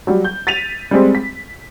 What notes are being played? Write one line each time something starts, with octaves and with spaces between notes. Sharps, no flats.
F#3 G3
G6
A6 B6 D#7 F7
G3 G#3 C4
B6